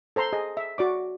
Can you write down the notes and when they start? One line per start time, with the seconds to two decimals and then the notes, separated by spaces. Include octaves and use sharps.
0.16 A4 C5 A#5 C6
0.33 G#4 D#5
0.57 E5
0.78 F#4 D5 D6